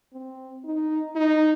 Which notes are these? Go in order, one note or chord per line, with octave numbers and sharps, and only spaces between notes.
C4
D#4
D#4